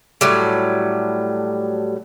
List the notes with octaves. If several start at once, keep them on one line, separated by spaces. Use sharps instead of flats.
A2 F#3 G3